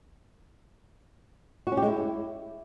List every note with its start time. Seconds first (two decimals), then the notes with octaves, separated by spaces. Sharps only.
1.67 F#4
1.72 C#4
1.77 G4
1.82 G#3
1.88 E4